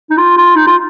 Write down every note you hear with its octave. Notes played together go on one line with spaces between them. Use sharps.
D#4
F4
F4
D#4
F4